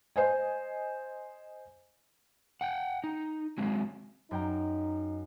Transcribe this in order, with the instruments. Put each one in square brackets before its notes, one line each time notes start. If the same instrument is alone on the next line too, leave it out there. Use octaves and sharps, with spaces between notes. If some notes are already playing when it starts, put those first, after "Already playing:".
[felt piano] C5 D#5 G#5
[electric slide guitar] F#5 G5
D#4
F#3 G#3 C4
[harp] F#2 G5 A#5 [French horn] D#4